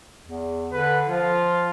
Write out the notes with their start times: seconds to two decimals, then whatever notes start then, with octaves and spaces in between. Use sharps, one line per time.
0.24 E2
0.73 D3 B4
1.08 F3 F4